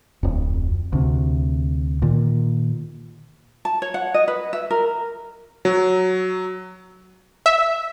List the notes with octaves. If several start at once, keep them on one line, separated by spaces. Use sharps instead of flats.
D1 F2
D2 C3
A#2 D#3
A5
C#5
F#5
D#5
B4
E5
A#4
F#3
E5